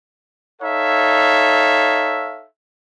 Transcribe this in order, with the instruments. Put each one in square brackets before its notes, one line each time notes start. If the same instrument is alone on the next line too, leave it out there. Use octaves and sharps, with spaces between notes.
[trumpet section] D#4 A4 C#5 E5 F5